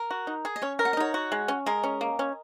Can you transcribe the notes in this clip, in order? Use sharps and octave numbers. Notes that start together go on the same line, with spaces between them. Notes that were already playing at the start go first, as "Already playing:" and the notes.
Already playing: A#4
F#4
D#4
G#4
D#5
C#4 C#5
A#4
F#5
D#5
D#4 C#5 F#5
F#4
G#3
C#4
G#3 A#4 D#5
C#4
A#3
C#4